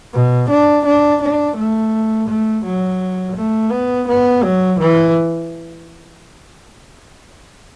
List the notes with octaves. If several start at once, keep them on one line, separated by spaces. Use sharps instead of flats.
B2
D4
D4
D4
A3
A3
F#3
A3
B3
B3
F#3
E3